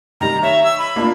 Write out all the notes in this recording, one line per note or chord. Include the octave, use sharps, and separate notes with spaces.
D#3 G3 A#5
C#5 E5
E6
B5
A#3 D4 F4